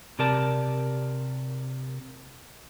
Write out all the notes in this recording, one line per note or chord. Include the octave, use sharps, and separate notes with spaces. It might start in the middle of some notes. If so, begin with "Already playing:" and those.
C3 G4 A#4 D5 A5